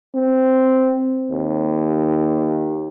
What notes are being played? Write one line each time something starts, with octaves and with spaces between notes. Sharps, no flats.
C4
D#2